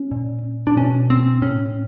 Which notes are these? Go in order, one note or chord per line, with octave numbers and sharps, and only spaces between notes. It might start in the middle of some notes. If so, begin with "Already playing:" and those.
Already playing: C#4
A#2
D4
B2 C#4
C4
A2 C#4